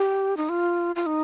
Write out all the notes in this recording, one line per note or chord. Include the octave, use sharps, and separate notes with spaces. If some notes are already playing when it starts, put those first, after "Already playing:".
Already playing: G4
D#4
F4
F4
D#4